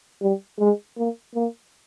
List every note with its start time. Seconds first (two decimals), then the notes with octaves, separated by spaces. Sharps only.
0.21 G3
0.59 G#3
0.97 A#3
1.35 A#3